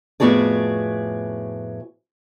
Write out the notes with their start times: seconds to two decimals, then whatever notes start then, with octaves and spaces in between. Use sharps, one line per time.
0.20 F2 A2 B3 F#4 G#4 D5